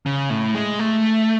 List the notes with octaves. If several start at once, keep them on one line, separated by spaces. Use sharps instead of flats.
C#3
A2
G#3
A3